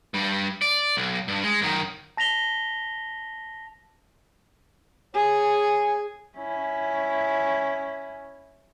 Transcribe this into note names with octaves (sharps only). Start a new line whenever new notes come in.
G2 G3
D5
B1
G2
G#3
F#2 D#3
A5 A#6 B6 F7 G7
G#4 C#5 G#5
C#4 E4